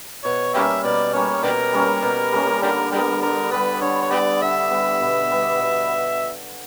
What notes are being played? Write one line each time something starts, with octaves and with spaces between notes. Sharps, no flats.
B2 C#5
G3 A#3 C#4 G4 C#5 E5
B2 D5
G3 A#3 C#4 C#5
B2 D4 G4 A#4
G3 A#3 C#4
B2
G3 A#3 C#4
D3 D4 G4 A#4
G3 B3 D4 G4 A#4
D3 A#4
G3 B3 B4
D3 C#5
C#5
G3 B3 G4 B4 D5
D3 E5
G3 B3
B2
G3 B3
B2